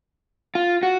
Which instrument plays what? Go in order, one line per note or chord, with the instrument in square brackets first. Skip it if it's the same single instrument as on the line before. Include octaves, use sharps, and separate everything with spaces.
[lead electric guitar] F4
F#4